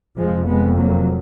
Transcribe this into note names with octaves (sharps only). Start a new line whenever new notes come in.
F1 F2 F3 G#3
G#3 B3
F#3 A#3